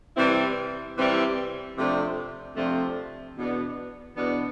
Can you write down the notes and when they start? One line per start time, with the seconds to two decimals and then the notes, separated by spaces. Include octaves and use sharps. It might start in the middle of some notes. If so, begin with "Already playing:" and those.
0.17 C3 E3 G3 C4 E4
0.97 C3 E3 G3 C4 E4
1.77 F2 C3 F3 A3 D4
2.56 F2 C3 F3 A3 D4
3.36 E2 B2 B3 D4
4.16 E2 B2 B3 D4